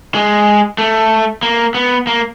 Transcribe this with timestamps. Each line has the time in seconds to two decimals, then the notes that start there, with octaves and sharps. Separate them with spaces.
0.15 G#3
0.78 A3
1.43 A#3
1.74 B3
2.07 A#3